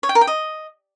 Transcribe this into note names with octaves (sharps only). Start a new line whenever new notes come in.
C#5
G5
A#4
G5
D#5